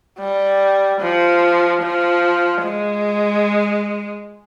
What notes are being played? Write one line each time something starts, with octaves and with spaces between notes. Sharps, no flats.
G3
F3
F3
G#3